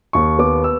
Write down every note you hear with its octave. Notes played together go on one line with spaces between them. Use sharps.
D#2 C#6
B3 D6
E6